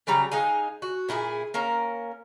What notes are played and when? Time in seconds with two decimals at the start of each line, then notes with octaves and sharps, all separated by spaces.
0.07 C#3 F#3 G3 A#5
0.32 G#3 D#4 F5 G#5
0.82 F#4
1.09 A#2 E4 F4 G#4
1.54 A#3 C#4 A#4 A#5